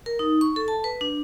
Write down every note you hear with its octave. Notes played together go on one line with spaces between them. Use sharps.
A#4
D#4
C#6
A4
A5
B4
D4